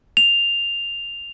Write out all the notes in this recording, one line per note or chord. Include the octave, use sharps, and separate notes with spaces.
F7